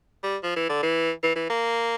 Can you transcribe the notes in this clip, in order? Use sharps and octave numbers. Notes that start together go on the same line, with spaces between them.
G3
F3
E3
D3
E3
E3
E3
A#3